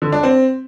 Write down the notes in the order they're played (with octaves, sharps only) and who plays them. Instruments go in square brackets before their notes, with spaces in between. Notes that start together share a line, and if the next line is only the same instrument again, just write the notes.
[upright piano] D3
D4
C4